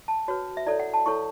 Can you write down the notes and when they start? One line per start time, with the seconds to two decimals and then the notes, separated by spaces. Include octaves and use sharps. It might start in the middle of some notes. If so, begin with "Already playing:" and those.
0.08 A5
0.28 F#4 B4 C#5
0.57 E5
0.66 E4 A4 C#5 D5
0.80 F#5
0.94 A5
1.06 E4 A4 C#5 C#6